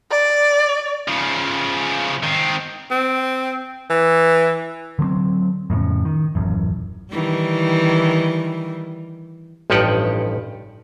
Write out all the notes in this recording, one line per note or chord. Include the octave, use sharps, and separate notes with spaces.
D5
C#3 F3
D#3 C4
C4
E3
D3 F#3 G#3 C4
F2 A2 C#3
D#3
D#1 A1 F#2
D#3 E3 G3
A1 G2 F3 D#4 G4 F#5